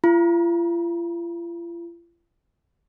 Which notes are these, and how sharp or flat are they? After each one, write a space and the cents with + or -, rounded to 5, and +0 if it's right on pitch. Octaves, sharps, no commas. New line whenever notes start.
F4 -45 B5 -45